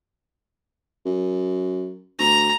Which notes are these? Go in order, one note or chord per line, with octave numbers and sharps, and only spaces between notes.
F#2
D2 A#5